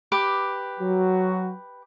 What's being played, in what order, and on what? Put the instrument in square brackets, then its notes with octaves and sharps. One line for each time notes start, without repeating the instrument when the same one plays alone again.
[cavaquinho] G4 B4 D6
[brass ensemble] F#3 F#4